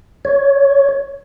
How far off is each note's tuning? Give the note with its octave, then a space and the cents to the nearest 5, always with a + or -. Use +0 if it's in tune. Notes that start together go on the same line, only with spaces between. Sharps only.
C#5 +20